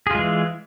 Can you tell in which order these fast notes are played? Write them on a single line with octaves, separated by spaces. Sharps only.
G#4 F4 G#3 E3